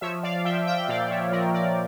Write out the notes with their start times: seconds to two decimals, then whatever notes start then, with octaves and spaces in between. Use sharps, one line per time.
0.01 F3 C#5 E5
0.23 D5 F5
0.45 F3 E5 G5
0.67 E5 G5
0.88 A#2 D5 F5
1.10 C#5 E5
1.32 F3 A#4 D5
1.54 A#4 D5